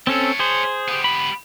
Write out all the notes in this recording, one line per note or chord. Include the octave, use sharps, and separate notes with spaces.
C4 C#4 A4 C#5 A5
G#4 C5
B3 G4
B5